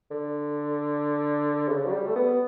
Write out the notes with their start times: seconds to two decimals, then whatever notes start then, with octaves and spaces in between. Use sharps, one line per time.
0.11 D3
1.68 C#3
1.86 F#3
1.93 G3
2.07 A3
2.16 B3